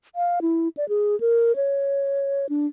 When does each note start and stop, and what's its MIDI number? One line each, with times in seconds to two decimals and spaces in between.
0.16 0.39 77
0.42 0.68 64
0.77 0.88 74
0.89 1.19 68
1.20 1.56 70
1.56 2.46 73
2.49 2.67 62